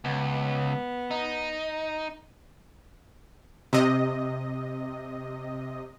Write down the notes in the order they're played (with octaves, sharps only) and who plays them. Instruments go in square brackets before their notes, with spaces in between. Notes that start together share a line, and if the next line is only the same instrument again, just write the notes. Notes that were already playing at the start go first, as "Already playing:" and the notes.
[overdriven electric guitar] C#2 [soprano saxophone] B3
[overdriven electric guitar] D#4
[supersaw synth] C3 D#5